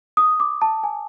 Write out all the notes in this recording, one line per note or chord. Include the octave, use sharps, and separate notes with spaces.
D#6
D6
A5
G#5